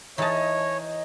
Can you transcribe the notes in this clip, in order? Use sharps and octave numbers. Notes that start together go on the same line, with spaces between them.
E3 D#4 G#4 C#5 D#5 A5